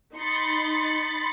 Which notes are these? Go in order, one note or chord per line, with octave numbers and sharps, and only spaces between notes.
D#4 B5 C6 A6 C#7